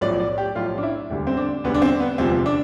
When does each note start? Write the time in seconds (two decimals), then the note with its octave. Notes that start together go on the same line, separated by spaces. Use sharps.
0.01 B1 A2 F3 D5
0.20 D5
0.38 G4
0.55 B1 A2 F3 F4
0.78 D4
0.83 E4
1.10 E1 D2 D3 G3
1.27 C4
1.37 D4
1.64 E1 D2 D3 G3 B3
1.74 D4
1.82 C4
2.00 B3
2.18 E1 D2 C3 F3 C4
2.46 D4